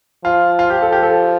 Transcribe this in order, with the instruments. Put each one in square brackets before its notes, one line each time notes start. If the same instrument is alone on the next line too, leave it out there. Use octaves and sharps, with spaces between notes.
[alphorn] F3 [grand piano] F4
[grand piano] F4
G4
A4
G4
A4